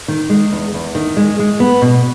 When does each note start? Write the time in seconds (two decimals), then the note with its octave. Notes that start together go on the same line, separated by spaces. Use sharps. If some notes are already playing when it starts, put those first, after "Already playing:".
0.08 D#3
0.29 G#3
0.52 E2
0.74 E2
0.95 D#3
1.17 G#3
1.39 G#3
1.60 B3
1.82 B2